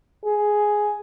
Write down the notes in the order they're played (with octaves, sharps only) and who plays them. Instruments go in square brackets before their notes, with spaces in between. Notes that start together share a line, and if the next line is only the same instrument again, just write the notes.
[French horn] G#4